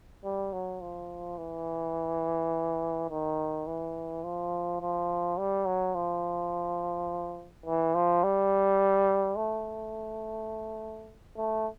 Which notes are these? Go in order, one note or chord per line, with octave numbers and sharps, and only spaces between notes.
G3
F#3
F3
E3
D#3
E3
F3
F3
G3
F#3
F3
E3
F3
G3
A3
A3